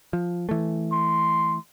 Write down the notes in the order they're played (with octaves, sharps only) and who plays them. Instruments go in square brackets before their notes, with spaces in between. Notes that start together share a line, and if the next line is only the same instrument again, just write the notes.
[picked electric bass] F3
E3 A3
[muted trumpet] C6